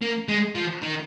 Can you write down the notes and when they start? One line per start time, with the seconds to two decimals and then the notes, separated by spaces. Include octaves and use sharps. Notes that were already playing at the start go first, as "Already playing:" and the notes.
0.02 A#3
0.28 G#3
0.55 F3
0.82 D#3